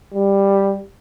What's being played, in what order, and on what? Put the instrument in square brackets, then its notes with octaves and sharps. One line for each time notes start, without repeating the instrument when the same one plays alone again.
[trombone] G3